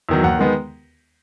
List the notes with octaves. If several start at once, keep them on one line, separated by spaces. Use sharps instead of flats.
E2 D#3 F#3
D#2 F#5
D#3 G#3 B3